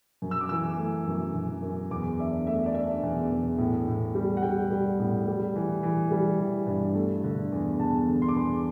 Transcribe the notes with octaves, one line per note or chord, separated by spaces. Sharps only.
F#2
E6
D6
E3 E6
A3
F#2
F#2
F#2
E2 D6
D4 E5
A3 E5
D5
D4 E5
E2
E2
A2
A2
G3
F#5
G3 G5
G3
A2
G3
E3
E3
G3
E3
G2
A3
D3
E2
E2 A5
D3
C6
D6
E2 C6